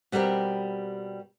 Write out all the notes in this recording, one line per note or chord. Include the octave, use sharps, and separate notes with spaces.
B2 G3 C4 G4 A#4